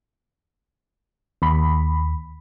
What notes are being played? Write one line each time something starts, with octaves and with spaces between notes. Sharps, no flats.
D#2 B5